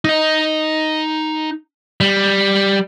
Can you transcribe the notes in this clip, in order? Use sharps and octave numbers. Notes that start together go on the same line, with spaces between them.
D#4 D#5
G3